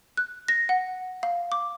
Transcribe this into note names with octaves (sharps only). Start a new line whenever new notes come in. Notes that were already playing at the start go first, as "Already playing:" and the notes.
F#6
A#6
F#5
F5
D6